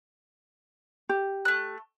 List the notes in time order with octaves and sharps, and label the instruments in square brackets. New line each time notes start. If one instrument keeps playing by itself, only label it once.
[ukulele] G4
[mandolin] A3 F#6